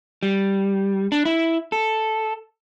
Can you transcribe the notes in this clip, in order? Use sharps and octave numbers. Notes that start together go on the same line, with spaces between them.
G3
D4
E4
A4